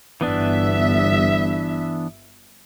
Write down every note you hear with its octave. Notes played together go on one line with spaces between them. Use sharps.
G1 E3 B3 D4 E5